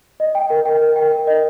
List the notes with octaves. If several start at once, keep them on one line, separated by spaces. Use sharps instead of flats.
D#5
G5
A#4
G5
A#4
G5
A#4
D#5